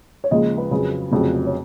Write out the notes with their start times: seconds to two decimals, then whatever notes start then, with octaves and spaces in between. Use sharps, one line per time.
0.24 C#5
0.31 D#2 C#3 F3 G#3 D#5
0.58 B4
0.71 F2 C#3 F#3
1.11 F1 F2 C#3 F#3
1.47 C#5